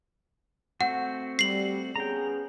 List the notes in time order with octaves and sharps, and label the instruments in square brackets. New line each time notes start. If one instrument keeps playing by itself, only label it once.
[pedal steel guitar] A3 C4 F#4 [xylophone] F#5
[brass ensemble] G3 [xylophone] C7 F#7
[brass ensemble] B3 C#4 G#4 [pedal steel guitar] G5 A#5